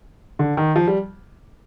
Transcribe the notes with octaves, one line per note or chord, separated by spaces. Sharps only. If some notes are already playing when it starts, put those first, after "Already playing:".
D3
D#3
F3
G3